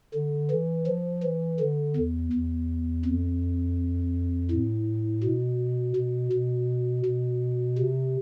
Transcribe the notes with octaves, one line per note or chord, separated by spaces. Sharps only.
D3
E3
F3
E3
D3
E2
E2
F2
A2
B2
B2
B2
B2
C3